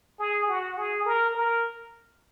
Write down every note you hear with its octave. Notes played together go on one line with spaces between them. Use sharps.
G#4
F#4
G#4
A#4
A#4